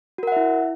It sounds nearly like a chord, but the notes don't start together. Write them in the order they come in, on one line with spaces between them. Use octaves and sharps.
F#4 A#4 F#5 E5 E4